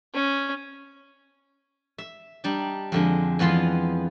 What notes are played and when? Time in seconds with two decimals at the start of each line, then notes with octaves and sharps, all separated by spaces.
0.14 C#4
1.98 E5
2.44 G3 D4 D#4
2.92 F2 D3 G#3
3.39 F2 E3 B3 F4 C6